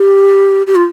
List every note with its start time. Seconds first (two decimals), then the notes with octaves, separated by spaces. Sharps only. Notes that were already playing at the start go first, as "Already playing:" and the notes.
Already playing: G4
0.67 G4
0.75 F4